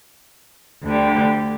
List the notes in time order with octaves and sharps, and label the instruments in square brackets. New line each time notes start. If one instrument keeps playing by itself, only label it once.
[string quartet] D2 D3 G3